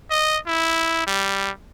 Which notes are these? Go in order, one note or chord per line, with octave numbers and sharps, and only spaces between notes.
D#5
E4
G3